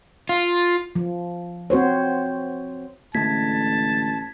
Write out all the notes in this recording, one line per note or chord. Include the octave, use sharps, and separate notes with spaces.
F4
F3
C4 F#4 C5 C#5
A1 D3 G#3 A3 A5 G#6 B6